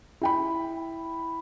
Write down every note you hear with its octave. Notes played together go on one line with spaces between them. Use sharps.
E4 G5 B5